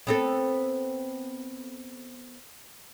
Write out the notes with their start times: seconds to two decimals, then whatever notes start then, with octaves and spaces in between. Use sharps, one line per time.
0.07 B3 C4 A4